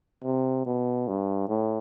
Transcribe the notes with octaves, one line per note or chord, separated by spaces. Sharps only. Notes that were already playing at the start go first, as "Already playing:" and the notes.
C3
B2
G2
A2